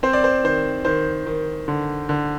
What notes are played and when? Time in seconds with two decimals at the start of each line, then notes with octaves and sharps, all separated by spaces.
0.03 C4 C5
0.13 D5
0.24 C5
0.44 D#3 C5
0.85 D#3 C5
1.26 D#3
1.68 D3
2.09 D3